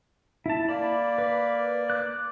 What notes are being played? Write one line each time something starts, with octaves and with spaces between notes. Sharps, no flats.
E4 A5
A#3 D5 B5
B4
D6 F#6